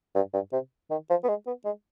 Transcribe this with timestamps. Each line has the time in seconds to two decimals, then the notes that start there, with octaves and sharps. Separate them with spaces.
0.15 G2
0.34 G2
0.53 C3
0.90 D#3
1.10 F3
1.24 B3
1.29 G#3
1.46 B3
1.65 G#3